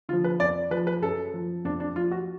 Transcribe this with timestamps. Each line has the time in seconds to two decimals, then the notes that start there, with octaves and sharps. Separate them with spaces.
0.09 D3 F4
0.13 F3
0.24 B4
0.40 F2 D5
0.71 F3 B4
0.87 B4
1.02 F#2 A4
1.34 F3
1.65 F2 D4
1.80 D4
1.96 F3 F4
2.11 F#4